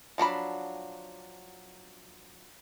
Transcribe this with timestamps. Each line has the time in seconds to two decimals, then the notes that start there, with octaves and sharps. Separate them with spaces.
0.18 F3 F#3 D4 B5